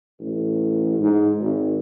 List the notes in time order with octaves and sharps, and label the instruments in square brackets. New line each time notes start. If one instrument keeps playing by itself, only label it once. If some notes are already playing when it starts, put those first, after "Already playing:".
[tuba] A1
G#2
G#1